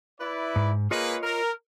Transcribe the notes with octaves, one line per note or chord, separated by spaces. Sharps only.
E4 B4 D5
G#2
A#3 F4 G#4 B4 C#5 D#5
A#4